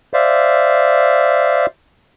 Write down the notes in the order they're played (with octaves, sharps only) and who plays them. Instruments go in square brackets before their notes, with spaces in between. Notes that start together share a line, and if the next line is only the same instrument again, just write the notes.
[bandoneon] C5 D5 E5 F5